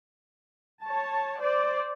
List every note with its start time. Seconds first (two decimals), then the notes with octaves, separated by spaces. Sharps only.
0.83 C#5 A5
1.41 C5 D5